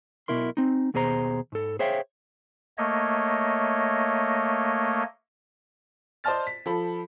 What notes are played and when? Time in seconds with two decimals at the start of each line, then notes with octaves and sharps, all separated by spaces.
0.28 B1 B2 E4 A#4 C6
0.57 C4 D#4
0.94 D#2 B2 G#4 C5 A#5
1.52 G#2 A4
1.79 G#4 C5 C#5 E5 F5 G5
2.78 A3 A#3 C#5 D#5
6.24 C5 D5 D#5 A5 F6 A6
6.47 B6
6.66 F3 A4 B5